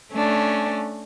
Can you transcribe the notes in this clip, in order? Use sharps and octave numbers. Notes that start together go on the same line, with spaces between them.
A3 C#4 D4